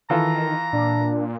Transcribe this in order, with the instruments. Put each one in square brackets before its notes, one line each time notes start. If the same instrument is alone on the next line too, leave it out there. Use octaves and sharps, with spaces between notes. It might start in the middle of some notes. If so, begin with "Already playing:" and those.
[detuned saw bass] D#3 [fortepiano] E3 F4 A4 [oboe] A#5
[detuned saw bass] A#2 [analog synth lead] D4